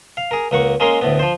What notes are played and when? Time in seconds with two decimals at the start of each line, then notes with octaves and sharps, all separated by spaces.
0.17 F5
0.31 G#4 A#4
0.51 C#2 A#3 F#5 C#6
0.80 G#3 A#3 C#4 G#4 A#4 C6
1.01 D2 A2 B3
1.19 F3 C5